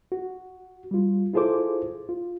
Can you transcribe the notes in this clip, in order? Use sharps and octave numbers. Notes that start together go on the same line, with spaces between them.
F#4
G3 F4
E4 F4 G#4 A4 C5 D6
F4